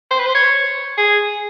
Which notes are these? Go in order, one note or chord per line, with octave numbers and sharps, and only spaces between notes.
C5
B4
C5
C#5
G#4